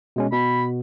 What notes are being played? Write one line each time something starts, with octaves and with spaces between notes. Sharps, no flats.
B2 G#3 C#4
B2 B5